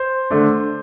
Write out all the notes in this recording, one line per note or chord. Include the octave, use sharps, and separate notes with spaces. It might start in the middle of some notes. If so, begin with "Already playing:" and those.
Already playing: C5
D3 A3 D4